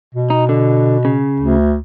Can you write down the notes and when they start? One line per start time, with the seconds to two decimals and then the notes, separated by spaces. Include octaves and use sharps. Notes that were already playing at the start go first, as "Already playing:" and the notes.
0.15 B2
0.30 D#4
0.49 D3
1.05 C#3
1.40 D2